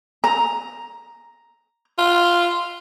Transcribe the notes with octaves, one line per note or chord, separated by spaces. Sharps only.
A#5
F4